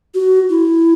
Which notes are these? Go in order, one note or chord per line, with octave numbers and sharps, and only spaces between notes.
F#4
E4